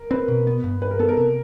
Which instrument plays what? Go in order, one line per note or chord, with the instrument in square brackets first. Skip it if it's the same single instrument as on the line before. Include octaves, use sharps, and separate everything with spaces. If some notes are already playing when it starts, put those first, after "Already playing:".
Already playing: [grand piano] A#4
[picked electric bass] C4 [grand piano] B4
[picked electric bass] B2
B3
G2
[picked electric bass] G2 [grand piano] B4
[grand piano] A#4
[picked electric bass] B3 [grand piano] A4
[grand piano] A#4
[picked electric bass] C3